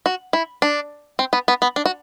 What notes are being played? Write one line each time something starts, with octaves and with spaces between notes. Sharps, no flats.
F#4
E4
D4
C4
B3
B3
B3
D4
F#4